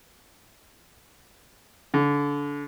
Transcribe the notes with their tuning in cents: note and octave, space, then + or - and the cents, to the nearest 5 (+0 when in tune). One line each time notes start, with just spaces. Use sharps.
D3 -30